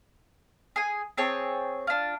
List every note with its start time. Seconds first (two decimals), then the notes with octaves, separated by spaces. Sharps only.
0.76 G#4 G#5
1.18 C4 G#4 C#5 A5
1.87 D4 F4